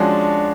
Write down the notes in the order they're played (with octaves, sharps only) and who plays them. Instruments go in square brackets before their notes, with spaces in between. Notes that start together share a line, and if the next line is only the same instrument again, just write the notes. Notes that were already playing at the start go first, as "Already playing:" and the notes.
Already playing: [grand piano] F3 G#3 C#4 F#4 [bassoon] D4